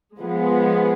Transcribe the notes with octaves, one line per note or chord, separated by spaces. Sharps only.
F3 G#3 B3